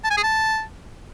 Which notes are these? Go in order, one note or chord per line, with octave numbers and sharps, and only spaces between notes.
A5
G#5
G#4
A5